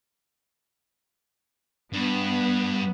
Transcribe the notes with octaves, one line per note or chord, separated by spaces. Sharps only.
G2 B3